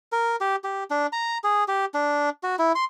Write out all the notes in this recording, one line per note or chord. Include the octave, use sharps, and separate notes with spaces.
A#4
G4
G4
D4
A#5
G#4
G4
D4
F#4
E4
C6